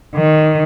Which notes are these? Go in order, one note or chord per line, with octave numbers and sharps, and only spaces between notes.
D#3